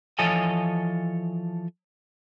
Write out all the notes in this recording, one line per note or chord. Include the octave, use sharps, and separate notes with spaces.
E3 F3 A4 C#5 D#5 G#5